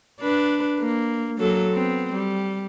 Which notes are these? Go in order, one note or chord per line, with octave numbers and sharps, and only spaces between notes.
D4 B4
A#3
F#3 A#3 A4
B3 C4
G3